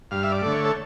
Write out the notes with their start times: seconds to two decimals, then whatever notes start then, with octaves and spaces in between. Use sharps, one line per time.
0.11 G2 F5
0.23 E5
0.32 D5
0.42 D3 A3
0.51 C#5
0.65 A4